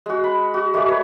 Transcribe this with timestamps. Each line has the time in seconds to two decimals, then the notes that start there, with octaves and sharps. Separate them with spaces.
0.06 G#3 F#4
0.24 B5
0.54 F#4
0.74 G#3 A3 F#4 D5
0.88 B4 C#5